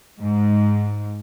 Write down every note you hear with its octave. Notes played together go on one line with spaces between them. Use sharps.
G#2